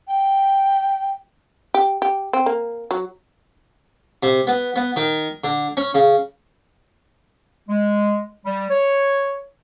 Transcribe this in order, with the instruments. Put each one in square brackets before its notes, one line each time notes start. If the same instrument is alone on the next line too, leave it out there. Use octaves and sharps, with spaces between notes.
[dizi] G5
[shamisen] G4
G4
C4
A#3
F#3
[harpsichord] C3
B3
B3
D#3
D3
C#4
C#3
[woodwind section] G#3
G3
C#5